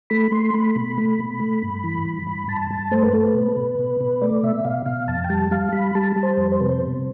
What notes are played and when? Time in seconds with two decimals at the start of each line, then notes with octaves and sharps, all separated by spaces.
0.10 A3 B5
0.32 A3 C6
0.54 A3 B5
0.75 B2 B5
0.98 A3
1.19 B2
1.40 A3
1.63 G2
1.84 E3
2.05 G2
2.27 G2
2.48 G2 A5
2.71 G2
2.91 A3 C5
3.03 B4
3.13 A3 A4
3.26 B4
3.35 B2
3.57 B2
3.79 B2
4.01 B2
4.22 A3 D5
4.43 B2 E5
4.65 B2 F5
4.86 B2 F5
5.08 F2 A5
5.24 G5
5.29 G3 A5
5.51 G3 F5
5.72 G3 B5
5.95 G3 A5
6.16 G3
6.23 C5
6.37 F2
6.52 C5
6.60 C3 B4
6.69 C5
6.81 B2